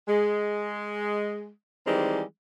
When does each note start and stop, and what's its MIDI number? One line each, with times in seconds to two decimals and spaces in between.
0.08 1.49 56
1.86 2.22 51
1.86 2.22 52
1.86 2.22 55
1.86 2.22 56
1.86 2.22 60